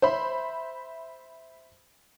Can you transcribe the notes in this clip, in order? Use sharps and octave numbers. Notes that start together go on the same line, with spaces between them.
C5 E5 B5